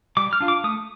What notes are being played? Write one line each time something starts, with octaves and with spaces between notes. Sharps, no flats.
G3 D6
F6
D4 F4
D6
A3 D#6